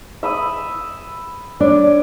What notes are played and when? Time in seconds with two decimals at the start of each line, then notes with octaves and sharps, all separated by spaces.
0.23 E5 B5 D#6
1.60 D4 C#5 D5